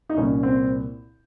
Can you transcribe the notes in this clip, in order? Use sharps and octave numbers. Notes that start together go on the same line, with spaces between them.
D#4
C2 A#2 C#4
C4